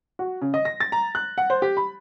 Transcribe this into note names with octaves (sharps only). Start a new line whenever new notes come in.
F#4
C#3
D#5
A#6
A6
A#5
F#6
F#5
C5
G4
B5